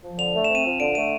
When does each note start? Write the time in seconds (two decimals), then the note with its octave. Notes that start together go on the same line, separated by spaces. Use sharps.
0.03 F3
0.18 D3 F7
0.34 A3
0.44 C4 E7
0.55 D#7
0.65 F3
0.80 D3 D7
0.95 A3 D#7